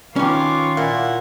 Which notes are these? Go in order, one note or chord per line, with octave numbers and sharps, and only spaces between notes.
D#3 C#4 F4 B4 C#6 D6
A#2 E4 F#5